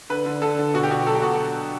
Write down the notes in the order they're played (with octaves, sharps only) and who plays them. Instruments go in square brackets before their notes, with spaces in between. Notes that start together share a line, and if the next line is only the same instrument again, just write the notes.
[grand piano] D3 B4
D3
D3 A4
D3
B2 F#4
G4
B2 F#4
F#3 A4
G4
B2 F#4